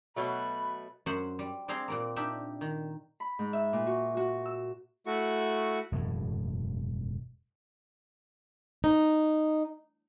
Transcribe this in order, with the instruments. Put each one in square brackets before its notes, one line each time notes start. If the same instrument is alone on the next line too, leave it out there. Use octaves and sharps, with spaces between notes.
[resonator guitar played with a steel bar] B2 F#3 A3 [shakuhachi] B5
[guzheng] F#2 C5 F#5
G3
G3 C4 G#4 F5 A#5 C6
A#2 G3 A#3
D4 D#4 G4 E5
D#3
[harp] B5
G#2
E5
A#2
F#4
F#4
E6
[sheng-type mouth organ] A3 E4 F#4 C#6
[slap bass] E1 F#2 A2
[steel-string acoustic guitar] D#4